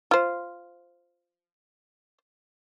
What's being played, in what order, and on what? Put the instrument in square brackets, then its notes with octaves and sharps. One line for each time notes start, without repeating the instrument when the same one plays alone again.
[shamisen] F4 C5